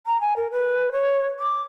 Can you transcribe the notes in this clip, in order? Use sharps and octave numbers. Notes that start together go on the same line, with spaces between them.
A#5
G#5
A#4
B4
C#5
D6